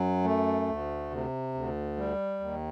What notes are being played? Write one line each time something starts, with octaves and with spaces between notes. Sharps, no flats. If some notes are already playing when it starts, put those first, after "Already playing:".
Already playing: F#2 F#3
A3
D2
C3
D2
G3
D#2